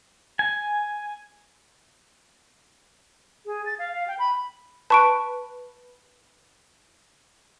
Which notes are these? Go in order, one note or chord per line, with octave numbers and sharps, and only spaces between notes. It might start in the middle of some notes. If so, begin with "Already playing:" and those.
G#5
G#4
A6
F5
F5
G5
B5
B4 A5 C#6 D7